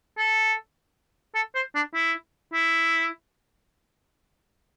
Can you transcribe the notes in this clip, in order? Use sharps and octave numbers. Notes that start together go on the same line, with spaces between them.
A4
A4
C5
D4
E4
E4